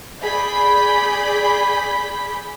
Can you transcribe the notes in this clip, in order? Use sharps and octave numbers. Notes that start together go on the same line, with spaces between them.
G#4 D5 B5 G6 B6